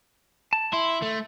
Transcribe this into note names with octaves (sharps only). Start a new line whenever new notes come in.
A5
E4 C6
A3